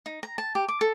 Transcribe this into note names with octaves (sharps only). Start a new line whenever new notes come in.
D#4
A#5
A5
G4
D6
A4